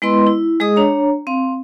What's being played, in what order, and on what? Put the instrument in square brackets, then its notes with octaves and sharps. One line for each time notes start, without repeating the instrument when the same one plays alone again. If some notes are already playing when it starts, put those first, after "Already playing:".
[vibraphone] G#3 B3 E4 B4 D#5 C6
E4
G#3 G#4 D#5 D#6
D4 C#5 A#5
C4 F5